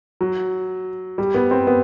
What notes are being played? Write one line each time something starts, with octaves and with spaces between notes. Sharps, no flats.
F#3
G3
B3
C4
B3